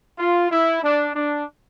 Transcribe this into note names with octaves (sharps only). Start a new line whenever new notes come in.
F4
E4
D4
D4